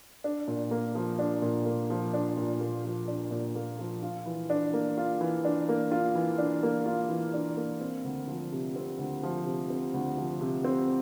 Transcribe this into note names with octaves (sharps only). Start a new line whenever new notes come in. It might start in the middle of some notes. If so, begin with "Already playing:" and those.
D4
A#2
A#3
F3
D4
A#2
A#3
F3
D4
A#2
A#3
F3
D4
A#2
A#3
F3
F4
E3
D4
A#3
F4
E3
D4
A#3
F4
E3
D4
A#3
F4
E3
D4
A#3
C4
D2
F3
C3
C4
D2
F3
C3
C4
D2
F3
C3
C4